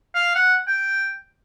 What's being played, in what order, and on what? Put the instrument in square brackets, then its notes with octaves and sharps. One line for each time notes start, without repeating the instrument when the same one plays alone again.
[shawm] F5
F#5
G5